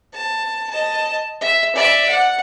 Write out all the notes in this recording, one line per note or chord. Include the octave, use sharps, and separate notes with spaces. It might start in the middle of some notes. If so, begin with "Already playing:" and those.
A5
D#5 A5
E5
D5 E5
F#5